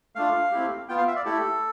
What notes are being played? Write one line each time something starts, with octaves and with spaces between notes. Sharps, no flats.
A3 D4 F4 F5
A3 C4 E4 G4
B3 F4 G5
F5
E5
D5
A3 E4 G4 A4